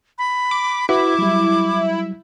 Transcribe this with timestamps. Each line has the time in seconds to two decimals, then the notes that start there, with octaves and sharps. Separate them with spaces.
0.18 B5
0.51 D6
0.89 E4 F#4 B4 D6
1.19 F#3 G3